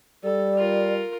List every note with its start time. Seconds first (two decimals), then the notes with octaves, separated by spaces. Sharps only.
0.24 G3 A4 D5
0.57 F4 A#4